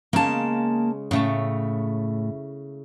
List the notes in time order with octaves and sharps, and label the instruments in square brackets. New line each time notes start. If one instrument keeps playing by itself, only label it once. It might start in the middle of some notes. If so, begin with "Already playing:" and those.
[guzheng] C#3 G#3 [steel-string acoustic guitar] A#3 A5
[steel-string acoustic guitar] A2 [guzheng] C#3 A3 A5